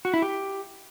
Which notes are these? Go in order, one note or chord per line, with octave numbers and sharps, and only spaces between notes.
F#4
E4
G4